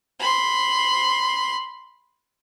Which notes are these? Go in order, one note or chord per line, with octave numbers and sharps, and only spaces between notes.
B5 C6